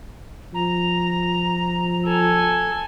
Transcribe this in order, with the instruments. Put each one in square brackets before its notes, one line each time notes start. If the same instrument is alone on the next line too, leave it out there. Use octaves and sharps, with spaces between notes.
[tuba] F3 [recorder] A#5
[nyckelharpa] A4 G#5